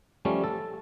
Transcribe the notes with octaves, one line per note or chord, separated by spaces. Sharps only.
F3 G3 A3 C#4
A4